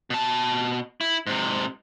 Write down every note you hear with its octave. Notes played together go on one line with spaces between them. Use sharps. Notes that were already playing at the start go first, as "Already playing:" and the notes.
B2 A5
E4
G#2 C3